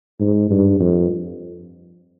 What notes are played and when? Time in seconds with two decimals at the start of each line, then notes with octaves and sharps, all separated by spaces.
0.20 G#2
0.50 G2
0.80 F2